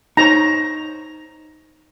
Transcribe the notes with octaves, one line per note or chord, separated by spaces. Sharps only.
D#4 C5 C#5 A#5